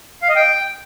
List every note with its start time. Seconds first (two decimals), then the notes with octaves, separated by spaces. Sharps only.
0.22 F5
0.29 D#5
0.36 G5